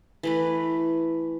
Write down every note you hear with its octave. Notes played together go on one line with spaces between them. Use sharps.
E3 A3 B4